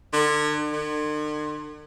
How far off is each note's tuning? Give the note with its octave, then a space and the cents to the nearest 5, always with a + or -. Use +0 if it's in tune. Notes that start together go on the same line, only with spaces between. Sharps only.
D3 +35
D3 +45